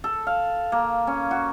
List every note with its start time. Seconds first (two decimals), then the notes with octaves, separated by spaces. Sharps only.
0.04 A4
0.27 F5
0.72 A#3
1.07 C#4
1.31 F#4